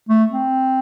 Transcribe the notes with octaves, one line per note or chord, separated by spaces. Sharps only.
A3
C4